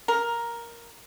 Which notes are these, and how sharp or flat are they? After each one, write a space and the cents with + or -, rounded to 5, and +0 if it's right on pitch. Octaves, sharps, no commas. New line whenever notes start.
A#4 +5